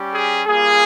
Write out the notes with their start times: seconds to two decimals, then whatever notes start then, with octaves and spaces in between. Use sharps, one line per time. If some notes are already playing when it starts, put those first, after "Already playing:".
Already playing: G3 C#4 G4
0.12 G#4
0.46 G3 A#3 F4 G#4